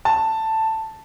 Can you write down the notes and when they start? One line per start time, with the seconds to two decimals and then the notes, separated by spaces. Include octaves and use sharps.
0.05 A5